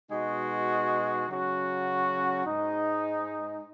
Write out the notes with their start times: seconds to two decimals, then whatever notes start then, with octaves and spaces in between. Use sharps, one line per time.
0.10 B2 G#3 D#4 F#4
1.28 C#3 F#3 C#4 F#4
2.46 G#2 G#3 D#4